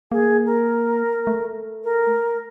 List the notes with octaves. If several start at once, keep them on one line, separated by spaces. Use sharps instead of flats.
A#3 G#4
A#4
A3
A#4